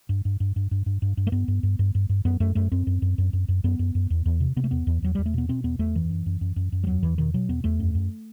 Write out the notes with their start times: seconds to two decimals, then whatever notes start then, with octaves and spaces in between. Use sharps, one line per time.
0.09 G2
0.25 G2
0.40 G2
0.56 G2
0.71 G2
0.86 G2
1.02 G2
1.17 G2
1.27 A3
1.32 G2 B3
1.48 G2
1.63 G2
1.79 G2
1.95 G2
2.09 G2
2.25 F#2 B3
2.40 F#2 A3
2.55 F#2 A3
2.72 F#2 C4
2.87 F#2
3.02 F#2
3.18 F#2
3.33 F#2
3.48 F#2
3.64 F#2 B3
3.79 F#2
3.95 F#2
4.10 E2
4.26 E2
4.40 C3
4.56 C3 B3
4.64 A3
4.71 E2 B3
4.87 E2
5.02 E2 F#3
5.15 E2 G3
5.26 A3
5.34 B2 B3
5.49 B2 C4
5.64 E2 B3
5.79 E2 A3
5.95 F#2 E3
6.10 F#2
6.26 F#2
6.41 F#2
6.56 F#2
6.72 F#2
6.84 G3
6.87 E2 F#3
7.03 E2 E3
7.18 B2 D#3
7.34 B2 F#3
7.49 E2 B3
7.64 E2 A3
7.80 F#2
7.95 F#2